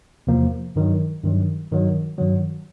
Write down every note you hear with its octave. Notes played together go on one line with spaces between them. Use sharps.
E2 C3 F3 A#3
G2 D#3 F#3
G2 D#3 F#3
G2 D#3 F#3
G2 D#3 F#3